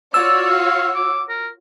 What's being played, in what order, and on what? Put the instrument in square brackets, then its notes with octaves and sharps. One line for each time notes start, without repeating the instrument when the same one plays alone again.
[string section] F4 F#4 C#5 [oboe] D5 [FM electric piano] E6
[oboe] F5
D6
A#4